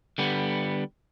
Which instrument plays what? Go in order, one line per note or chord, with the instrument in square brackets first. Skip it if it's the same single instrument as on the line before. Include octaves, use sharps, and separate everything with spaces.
[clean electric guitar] D3 G3 B3